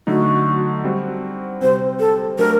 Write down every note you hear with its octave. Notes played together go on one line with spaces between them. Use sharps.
D3 F#3 A3 D#4 F#4
G3 C4 F#4
C3 G3 C4 C5
A4
F#3 A3 D4 A#4